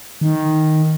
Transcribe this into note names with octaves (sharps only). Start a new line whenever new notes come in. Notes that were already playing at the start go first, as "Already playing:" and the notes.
D#3